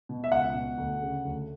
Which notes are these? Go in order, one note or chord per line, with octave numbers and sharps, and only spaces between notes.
B2
E5
C#2 F#5
B2
D2
C#3
D2